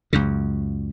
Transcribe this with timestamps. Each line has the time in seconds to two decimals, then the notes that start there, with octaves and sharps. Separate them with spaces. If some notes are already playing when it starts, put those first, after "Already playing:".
0.13 C#2 F#2 C#3